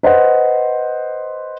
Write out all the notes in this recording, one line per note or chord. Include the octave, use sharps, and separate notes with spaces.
B4 C5 D#5 F#5